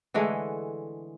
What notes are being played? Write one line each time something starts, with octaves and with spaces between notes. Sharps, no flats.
D3 E3 G#3 A3